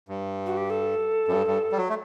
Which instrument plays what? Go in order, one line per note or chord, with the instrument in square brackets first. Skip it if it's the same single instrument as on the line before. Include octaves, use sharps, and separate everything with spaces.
[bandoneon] G2
[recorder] F#4
G4
A4
[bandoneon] F#2
G2
G2
G3
F#3
A3